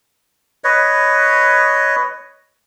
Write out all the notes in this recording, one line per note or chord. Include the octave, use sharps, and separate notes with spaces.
B4 C#5 D#5